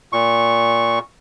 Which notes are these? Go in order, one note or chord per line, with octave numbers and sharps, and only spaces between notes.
A#2 C#6